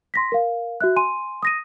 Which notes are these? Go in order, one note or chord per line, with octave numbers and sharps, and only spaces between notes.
C6 A#6 B6
A#4 F5
F#4 E5 F#6
G#5 C6 D#7
D#6 A#6 D#7